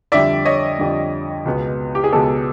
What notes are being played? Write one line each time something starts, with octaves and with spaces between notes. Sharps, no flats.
F2 D3 G3 D5 E5
C#5 D#5
F2 D3 G3
C#2 B2 G#3 B3
G4
G#4
C#2 B2 G#3 B3 G4 A4